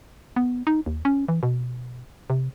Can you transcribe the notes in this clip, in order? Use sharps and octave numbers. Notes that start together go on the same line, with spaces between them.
B3
D#4
D#2
C#4
E3
B2
C3